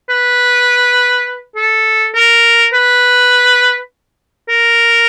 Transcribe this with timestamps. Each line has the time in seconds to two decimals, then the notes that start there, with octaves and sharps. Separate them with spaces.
0.10 B4
1.56 A4
2.15 A#4
2.73 B4
4.49 A#4